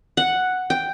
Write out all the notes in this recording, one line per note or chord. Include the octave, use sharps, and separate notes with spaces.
F#5
G5